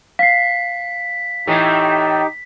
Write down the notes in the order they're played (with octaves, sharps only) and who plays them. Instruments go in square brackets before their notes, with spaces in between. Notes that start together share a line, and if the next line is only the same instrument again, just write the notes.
[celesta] F5 C7 [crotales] B6
[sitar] A2 E3 A3 [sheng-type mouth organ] D#4 G4